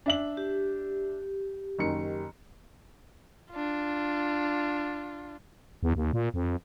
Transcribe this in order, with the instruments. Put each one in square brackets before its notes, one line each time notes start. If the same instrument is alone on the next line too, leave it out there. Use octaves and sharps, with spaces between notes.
[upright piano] D4 E5 F#7
[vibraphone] G4
[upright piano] F#1 D#3 C#7
[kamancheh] D4 F4
[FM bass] E2
D#2
A#2
F2